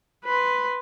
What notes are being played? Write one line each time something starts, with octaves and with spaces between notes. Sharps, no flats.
B4 C6